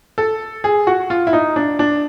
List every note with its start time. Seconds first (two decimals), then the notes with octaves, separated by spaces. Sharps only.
0.18 A4
0.64 G#4
0.87 F#4
1.10 F4
1.27 E4
1.33 D#4
1.56 D4
1.79 D4